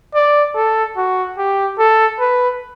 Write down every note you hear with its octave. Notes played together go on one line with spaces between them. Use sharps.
D5
A4
F#4
G4
A4
B4